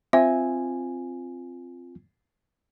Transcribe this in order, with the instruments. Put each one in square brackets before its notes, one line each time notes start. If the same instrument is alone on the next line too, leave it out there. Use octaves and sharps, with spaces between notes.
[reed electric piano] C4 F4 G#5 [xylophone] E5